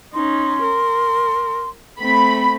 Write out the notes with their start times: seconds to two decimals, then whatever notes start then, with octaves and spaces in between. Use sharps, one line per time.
0.14 C#4 D#4 C6
0.63 A#4
2.00 A3 C4 B5